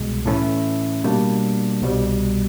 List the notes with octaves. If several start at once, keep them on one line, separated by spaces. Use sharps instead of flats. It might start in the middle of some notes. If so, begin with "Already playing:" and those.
Already playing: C2 B2 G#3
A2 E3 A3 C#4 E4
B2 G3 A#3 D4
C2 B2 G3